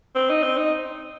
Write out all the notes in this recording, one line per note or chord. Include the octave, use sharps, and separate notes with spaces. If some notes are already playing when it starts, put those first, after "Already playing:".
C4
D#4
C4
D#4